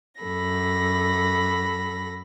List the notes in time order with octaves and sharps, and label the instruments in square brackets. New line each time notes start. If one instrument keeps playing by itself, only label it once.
[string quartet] F#2 A4 B5 A#6